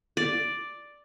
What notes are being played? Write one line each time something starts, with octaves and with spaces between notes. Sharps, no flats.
D5